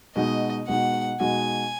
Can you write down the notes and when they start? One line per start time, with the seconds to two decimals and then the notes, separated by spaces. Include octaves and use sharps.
0.15 B2 G#3 D#4 F#4 D#5
0.68 B2 G#3 D#4 F#4 F#5
1.20 B2 G#3 D#4 F#4 G#5